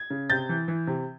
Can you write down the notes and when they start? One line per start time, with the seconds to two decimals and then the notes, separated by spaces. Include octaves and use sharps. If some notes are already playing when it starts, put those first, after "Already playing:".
Already playing: G#6
0.10 C#3
0.30 C3 G6 A6
0.49 E3
0.68 E3
0.87 C3